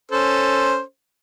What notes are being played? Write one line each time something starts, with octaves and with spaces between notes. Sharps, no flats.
C#4 A4 C5